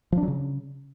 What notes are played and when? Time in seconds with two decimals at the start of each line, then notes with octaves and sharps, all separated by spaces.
0.12 F3
0.17 D4
0.23 F#3
0.28 C#3